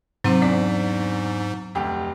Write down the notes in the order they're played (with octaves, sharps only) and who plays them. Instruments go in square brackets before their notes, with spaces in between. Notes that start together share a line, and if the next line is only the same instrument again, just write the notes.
[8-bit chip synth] G#2 [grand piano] C3 [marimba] F#3 C4 C5
[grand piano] E2 D4 B6
F1 D2 G4